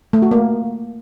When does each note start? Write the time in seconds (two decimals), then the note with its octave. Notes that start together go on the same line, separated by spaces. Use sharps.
0.13 A3
0.22 F#4
0.31 A#3